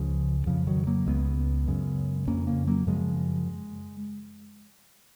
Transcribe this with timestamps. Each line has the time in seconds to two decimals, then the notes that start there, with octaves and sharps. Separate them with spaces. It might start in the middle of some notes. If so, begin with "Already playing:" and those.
Already playing: C#2 C#3 F3
0.46 F2 C#3 F3
0.67 D#3 F#3
0.87 F#3 A#3
1.06 C#2 C#3 G#3 B3
1.68 F#2 C#3
2.27 F2 C#3 A#3 C#4
2.47 A#3 C#4
2.67 F#3 A#3
2.87 F#2 C#3 F3 G#3